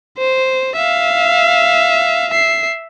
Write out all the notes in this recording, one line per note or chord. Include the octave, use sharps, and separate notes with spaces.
C5
E5 F5
E5 C7